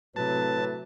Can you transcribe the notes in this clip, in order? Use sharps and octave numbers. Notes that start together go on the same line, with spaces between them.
A2 C3 F#3 B4 A5